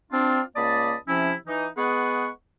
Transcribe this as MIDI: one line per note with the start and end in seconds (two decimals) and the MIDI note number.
0.12 0.40 60
0.12 0.40 62
0.12 0.40 65
0.56 0.94 37
0.56 0.94 58
0.56 0.94 74
0.56 0.94 81
0.56 0.94 83
0.56 0.94 87
1.08 1.33 48
1.08 1.33 53
1.08 1.33 61
1.08 1.33 64
1.47 1.67 52
1.47 1.67 63
1.77 2.28 56
1.77 2.28 59
1.77 2.28 68
1.77 2.28 71
1.77 2.28 78
1.77 2.28 85